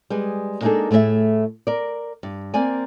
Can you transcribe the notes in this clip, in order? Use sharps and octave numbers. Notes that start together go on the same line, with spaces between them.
G3 G#3 G#4 B4
G#3 A#3 D4 D#4 G#4 A4
A2 A3 G#4 C5 E5
A#4 D5
G2
A#3 C4 D5 G#5